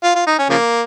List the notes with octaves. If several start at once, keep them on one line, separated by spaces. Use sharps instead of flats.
F4
F4
D#4
C#4
C#3 F3 A#3